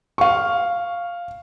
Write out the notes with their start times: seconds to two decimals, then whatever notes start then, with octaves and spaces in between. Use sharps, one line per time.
0.18 F5 C#6